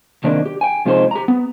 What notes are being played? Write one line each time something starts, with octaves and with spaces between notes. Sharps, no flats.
C3 D#3 A#3 C#4 D4
G4
G5 G#5
C3 F3 G#3 C#4 D#4 C5
G4 A#5
B3